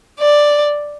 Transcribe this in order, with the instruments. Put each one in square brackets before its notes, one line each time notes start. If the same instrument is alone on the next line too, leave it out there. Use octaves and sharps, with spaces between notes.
[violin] D5